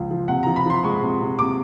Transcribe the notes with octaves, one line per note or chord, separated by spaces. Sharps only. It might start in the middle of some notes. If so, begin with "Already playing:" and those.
Already playing: C#2 F3
F3
C3 F#5
F3 A#5
B5
F3 C6
G#3 C#6
C3
C3
C3 D6